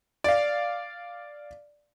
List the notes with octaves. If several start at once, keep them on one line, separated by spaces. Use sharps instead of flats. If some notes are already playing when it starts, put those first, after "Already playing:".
D5 F5